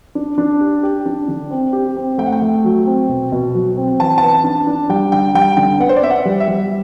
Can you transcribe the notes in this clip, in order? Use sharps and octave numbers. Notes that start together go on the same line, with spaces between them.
D4
D4
G4
G4
D4
D3
C4
G4
C4
A3 G5
F#5
G5
A3
F#3
C4
B2
B2
F#3
C4
E3 A5
B3 A5
D4
D4
G3 G5
D3 G5
G3 G5
D3 G5
B3 F#5
C5
D5
B3 E5
F#5
G3
E5
G3